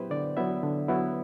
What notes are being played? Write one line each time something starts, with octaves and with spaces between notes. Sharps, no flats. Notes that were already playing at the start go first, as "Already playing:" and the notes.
Already playing: F#3 B3 E4 G4 B4 C5
D3 D5
F#3 B3 E4 E5
D3
F#3 B3 E4